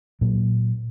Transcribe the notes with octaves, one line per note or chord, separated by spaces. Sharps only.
A#2 F#3